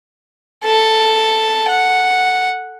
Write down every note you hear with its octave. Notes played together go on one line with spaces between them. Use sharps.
A4 A5
F#5